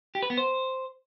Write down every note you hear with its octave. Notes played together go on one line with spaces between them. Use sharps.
G4
B4
B3
C5